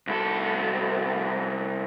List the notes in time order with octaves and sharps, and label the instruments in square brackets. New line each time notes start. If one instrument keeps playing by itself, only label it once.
[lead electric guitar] C2 A4